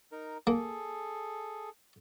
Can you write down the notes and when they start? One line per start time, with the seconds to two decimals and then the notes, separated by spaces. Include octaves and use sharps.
0.12 D#4 A#4
0.47 A#3 G#4 A4